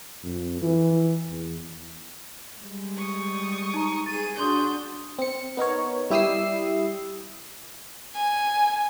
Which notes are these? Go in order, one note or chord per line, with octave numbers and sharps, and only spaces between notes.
F2
E3
E2
G3 G#3
C#6 D#6
D#4 A#5 D#7
G#4 A6 D#7
D4 F#4 G#4 C6 D#6 G6
C4 C#7
B3 D#4 A#4 C#5
G3 E4 G4 D#6 E6 C7
G#5